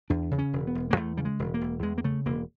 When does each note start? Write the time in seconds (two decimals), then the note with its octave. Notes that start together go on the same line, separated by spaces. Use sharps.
0.10 E2 D4
0.31 C#3
0.39 C#4
0.53 E1
0.67 B3
0.75 E1
0.91 A#3
0.96 E2 A3
1.17 C#3 G3
1.25 G#3
1.39 E1
1.54 A#3
1.61 E1
1.83 E2 G#3
1.98 A#3
2.04 C#3 A3
2.26 E1 A#3